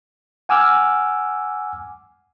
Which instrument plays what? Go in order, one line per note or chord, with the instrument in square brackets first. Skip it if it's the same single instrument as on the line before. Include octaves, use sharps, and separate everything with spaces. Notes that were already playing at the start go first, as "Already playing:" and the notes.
[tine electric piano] F#5 G#5 D6 E6 F6